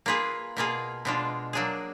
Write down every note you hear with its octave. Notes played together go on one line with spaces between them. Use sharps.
A#3 F4 G#4 B4
B2 A#3 F4 G#4
B2 G#3 D4 F4
F#3 A#3 D4 G#4